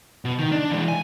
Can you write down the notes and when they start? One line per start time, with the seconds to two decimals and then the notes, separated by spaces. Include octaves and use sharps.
0.25 B2
0.39 D#3
0.52 D4
0.72 E3 G#3
0.88 G#5